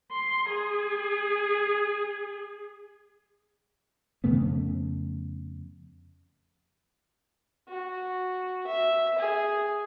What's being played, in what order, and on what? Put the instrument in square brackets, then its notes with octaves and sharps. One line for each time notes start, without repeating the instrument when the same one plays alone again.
[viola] C6
G#4
[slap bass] F2 C#3 A3 B3
[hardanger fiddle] F#4
E5
G#4